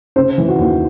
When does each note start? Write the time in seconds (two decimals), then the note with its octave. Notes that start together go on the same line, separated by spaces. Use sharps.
0.16 C#3 C5
0.38 E3
0.49 F#4
0.58 D#2